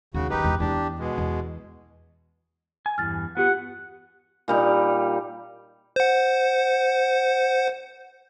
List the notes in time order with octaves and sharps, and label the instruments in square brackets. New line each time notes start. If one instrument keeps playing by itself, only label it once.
[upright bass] D#2 [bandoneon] C#3 F#4
[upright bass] D#3 G3 [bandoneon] D#4 G4 B4
[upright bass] E2
[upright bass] E2 [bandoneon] D4 G4
[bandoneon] B2 G#3
[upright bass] E2
[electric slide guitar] G#5
[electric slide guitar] E2 G2 E3 [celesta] F6 A6
[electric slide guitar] B3 [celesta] F4 G4 C#7 [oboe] F#5
[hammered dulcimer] A#2 G3 D#4
[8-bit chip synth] C5 F#5